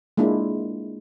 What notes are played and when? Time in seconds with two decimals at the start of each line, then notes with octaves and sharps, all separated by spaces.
0.17 G#3 A#3 D4 E4 F4